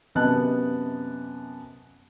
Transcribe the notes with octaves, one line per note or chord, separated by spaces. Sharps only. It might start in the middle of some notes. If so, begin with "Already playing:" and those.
F#2 C3 B3 D#5 A5 F#6